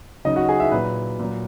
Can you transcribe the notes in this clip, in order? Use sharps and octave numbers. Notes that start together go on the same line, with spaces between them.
C#3 F#3 D#4 D#5
F#4 F#5
G#4 G#5
E4 E5
A#2 F#3 B4
A#2 F#3